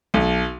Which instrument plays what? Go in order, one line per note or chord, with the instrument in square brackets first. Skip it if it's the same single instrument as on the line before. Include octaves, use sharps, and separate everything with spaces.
[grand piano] B1